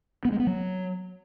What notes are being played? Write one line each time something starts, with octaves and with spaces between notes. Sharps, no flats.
B3
G#3
B3
F#3